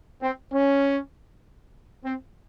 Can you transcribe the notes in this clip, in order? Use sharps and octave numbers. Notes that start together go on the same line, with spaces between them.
C4
C#4
C4